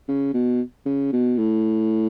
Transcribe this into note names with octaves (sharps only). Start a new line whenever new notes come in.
C#3
B2
C#3
B2
A2